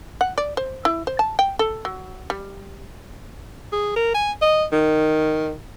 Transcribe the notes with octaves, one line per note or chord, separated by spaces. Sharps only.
F#5
D5
C5
E4
C5
A5
G5
A4
F#3
G3
G#4
A#4
G#5
D#5
D#3